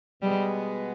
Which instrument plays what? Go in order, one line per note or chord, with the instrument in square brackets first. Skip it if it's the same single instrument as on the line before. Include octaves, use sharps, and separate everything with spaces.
[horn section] B2 G#3 B3 [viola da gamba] G3